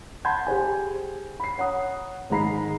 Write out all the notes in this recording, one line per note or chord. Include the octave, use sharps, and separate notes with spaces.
F#5 A5 B5 C6 G6 G#6
G4 G#4 C5 G#5
B5 C7
C#5 F#5 A#5 D#6
G#2 D#3 G#3 A#5 B5 C7